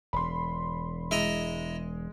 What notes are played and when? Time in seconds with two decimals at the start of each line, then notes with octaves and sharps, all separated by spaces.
0.13 E1 B5 C6
1.11 G#3 E4 D#5 A#5